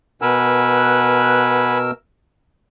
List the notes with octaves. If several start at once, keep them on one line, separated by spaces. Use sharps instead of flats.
B2 A#4 B4 F#5 G#5 E6